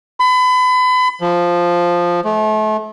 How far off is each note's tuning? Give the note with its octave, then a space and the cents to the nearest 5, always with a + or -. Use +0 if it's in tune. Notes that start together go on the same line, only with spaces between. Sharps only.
B5 +35
F3 +0
A3 -35